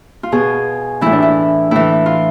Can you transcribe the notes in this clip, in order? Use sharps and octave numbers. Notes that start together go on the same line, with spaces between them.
F4
B2 G#4
A2 E3 E4
D4
E4
A2 E3 E4
F4